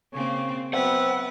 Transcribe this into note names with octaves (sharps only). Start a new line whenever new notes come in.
C#3 A#3 C4 C#5
F#3 B3 C4 B4 E5 F#5